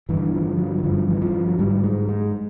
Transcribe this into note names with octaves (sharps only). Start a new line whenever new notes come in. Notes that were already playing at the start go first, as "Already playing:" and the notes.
G2 D3 E3
F3
F#3
E3
G2 D3 F3
E3
F3
F#3
G#2 G3
G#3
G#3